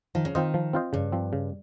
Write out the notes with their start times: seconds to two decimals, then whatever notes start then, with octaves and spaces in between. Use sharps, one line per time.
0.15 D#3 F3
0.25 C#3
0.35 D#3 C4 F4 C5 D#5
0.54 F3
0.73 C4 F4 C5 D#5
0.93 G2 C#3
1.12 F3 C4
1.33 C#3